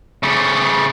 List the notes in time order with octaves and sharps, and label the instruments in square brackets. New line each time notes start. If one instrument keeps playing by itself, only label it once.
[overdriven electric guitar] C#3 A3